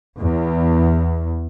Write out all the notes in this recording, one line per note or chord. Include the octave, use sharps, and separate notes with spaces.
E2